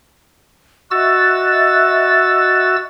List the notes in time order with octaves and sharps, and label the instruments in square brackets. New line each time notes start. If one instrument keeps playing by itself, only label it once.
[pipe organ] F#4 E6 A6 [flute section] D#5 E5 F#6